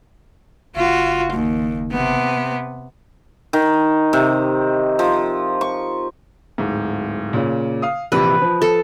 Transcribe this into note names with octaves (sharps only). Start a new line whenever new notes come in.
F#1 F4 F#4
D#2
C3 B3
D#3
C3
F3
C#6
D1 G#2
A#2 C#3
F5 D#6
A#1 C3 E3 B4
F3
A4